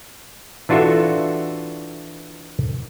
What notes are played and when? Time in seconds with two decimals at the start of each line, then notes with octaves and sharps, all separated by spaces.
0.69 E3 D4 F4 F#4 A4 E5